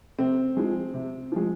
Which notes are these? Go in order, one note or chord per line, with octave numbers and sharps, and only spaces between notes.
C3 C4
F3 G#3
C3
F3 G#3